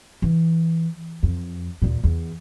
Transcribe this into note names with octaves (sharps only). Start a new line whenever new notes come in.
E3
F2
D#2 A#2
E2